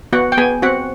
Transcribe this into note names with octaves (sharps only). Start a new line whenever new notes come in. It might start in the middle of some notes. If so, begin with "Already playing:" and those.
B3 F#4 F#5
G5
B3 G#4 G#5
C4 F#4 F#5